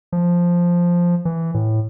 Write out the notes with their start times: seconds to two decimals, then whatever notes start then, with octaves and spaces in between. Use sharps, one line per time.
0.12 F3
1.25 E3
1.54 A2